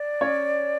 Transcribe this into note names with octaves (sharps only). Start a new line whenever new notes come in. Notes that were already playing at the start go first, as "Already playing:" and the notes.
Already playing: D5
C#4 C#5